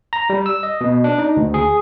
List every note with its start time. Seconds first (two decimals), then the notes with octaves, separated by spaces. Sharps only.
0.13 A#5
0.30 G3
0.46 E6
0.63 D#5
0.81 B2
1.04 D4
1.19 D#4
1.37 D2
1.54 G#4